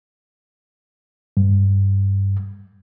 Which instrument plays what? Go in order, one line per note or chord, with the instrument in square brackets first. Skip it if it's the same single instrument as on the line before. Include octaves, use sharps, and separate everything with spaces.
[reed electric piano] G2